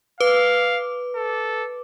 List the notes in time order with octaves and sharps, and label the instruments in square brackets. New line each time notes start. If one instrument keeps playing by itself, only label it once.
[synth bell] B4 D6 [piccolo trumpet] F5
[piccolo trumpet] A4